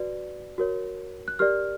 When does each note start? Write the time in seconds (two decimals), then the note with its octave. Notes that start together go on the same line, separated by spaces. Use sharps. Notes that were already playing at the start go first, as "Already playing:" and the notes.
Already playing: F#4 B4 D5
0.58 F#4 A#4 C#5
1.28 F#6
1.39 G4 A#4 D5 F6